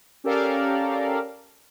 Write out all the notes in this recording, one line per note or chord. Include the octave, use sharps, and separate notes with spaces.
C#4 G4 A4 A#4 D5 F5